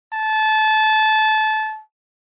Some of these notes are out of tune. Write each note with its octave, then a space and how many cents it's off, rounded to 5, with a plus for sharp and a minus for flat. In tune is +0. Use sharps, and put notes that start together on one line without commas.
A5 -25